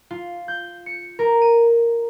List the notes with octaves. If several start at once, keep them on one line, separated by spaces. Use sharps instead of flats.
F4
G6
C#7
A#4
D#7